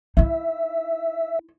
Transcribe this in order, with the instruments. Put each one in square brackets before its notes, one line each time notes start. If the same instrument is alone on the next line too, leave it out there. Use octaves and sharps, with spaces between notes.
[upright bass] D#4 E4 [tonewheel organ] E5